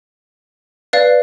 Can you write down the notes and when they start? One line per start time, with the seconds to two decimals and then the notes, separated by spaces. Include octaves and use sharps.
0.93 B4 D5 F5